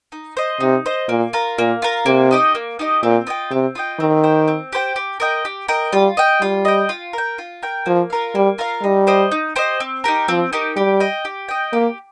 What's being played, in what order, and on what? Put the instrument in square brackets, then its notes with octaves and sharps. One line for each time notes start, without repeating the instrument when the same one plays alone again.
[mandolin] D#4
C5 D#5
[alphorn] C3 [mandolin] D#4
[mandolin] C5 D#5
[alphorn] A#2 [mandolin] A#3
[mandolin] F4 A#4
[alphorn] A#2 [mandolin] A#3
[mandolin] F4 A#4
[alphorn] C3 [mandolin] A#3
[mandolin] D#4 G4 D#5
A#3
D#4 G4 D#5
[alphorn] A#2 [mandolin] C4
[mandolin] F4 D#5 G5
[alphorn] C3 [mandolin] C4
[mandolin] F4 D#5 G5
[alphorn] D#3 [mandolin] C4
[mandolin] G4 C5 G5
C4
G4 C5 G5
G4
A#4 D#5 G5
G4
A#4 D#5 G5
[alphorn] G3 [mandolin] F4
[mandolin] D#5 G5
[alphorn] G3 [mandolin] F4
[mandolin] D#5 G5
F4
A#4 G5
F4
A#4 G5
[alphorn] F3 [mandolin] A#3
[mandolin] F4 A#4 F5
[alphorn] G3 [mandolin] A#3
[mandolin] F4 A#4 F5
[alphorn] G3 [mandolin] D#4
[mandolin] G4 C5 D#5
D#4
G4 C5 D#5
C4
D#4 G4 A#4
[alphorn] F3 [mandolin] C4
[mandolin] D#4 G4 A#4
[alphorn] G3 [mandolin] G4
[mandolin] D#5 G5
G4
D#5 G5
[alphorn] A#3 [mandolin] G4